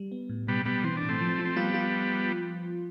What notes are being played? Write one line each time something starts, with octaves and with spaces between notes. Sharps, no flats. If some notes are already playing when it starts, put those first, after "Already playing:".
Already playing: G3
B3
A2
B2 G3 B3
B2 G3 B3
E3 C4
D4
A2
A3 C4
F3
F3
C4
G3 B3 F4
F4